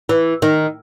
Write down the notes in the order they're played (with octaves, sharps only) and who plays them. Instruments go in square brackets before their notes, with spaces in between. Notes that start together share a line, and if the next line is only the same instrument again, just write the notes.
[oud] E3
D#3